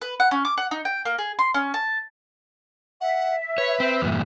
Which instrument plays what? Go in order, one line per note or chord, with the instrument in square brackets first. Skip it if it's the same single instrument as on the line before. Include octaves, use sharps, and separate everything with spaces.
[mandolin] B4
F#5
C#4
D6
F#5
D#4
G5
A#3
G#4
C6
C#4
A5
[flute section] E5 [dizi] F#5
[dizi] B4 [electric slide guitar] C#5
[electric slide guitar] C4
E2 G2 A#2